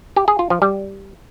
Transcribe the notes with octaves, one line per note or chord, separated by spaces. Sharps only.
G4
G#4
F4
F3
G3